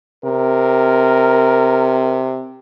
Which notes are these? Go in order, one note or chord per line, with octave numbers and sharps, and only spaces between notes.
C3 A#4